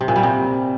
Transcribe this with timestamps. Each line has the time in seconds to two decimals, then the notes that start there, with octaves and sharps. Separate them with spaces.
0.01 C3
0.08 A#2
0.16 G3
0.23 C3